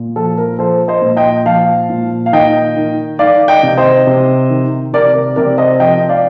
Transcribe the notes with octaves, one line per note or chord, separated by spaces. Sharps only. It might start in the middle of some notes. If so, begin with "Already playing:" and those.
Already playing: A#2
F3 A4
A#4
F3 A4 C5
C5 D#5
A#2
D#5 G5
F3 F5 A5
A#2
F5
D#3 D#5 G5
D#3
D#3 D5 F5
D#5 G5
C3
C5 D#5
C3
D#3
C3 A#4 D5
A#4
C3 A#4 D5
C5 D#5
F3 D#5 G5
D5 F5